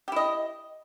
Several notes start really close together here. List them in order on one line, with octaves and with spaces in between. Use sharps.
G4 E4 D#5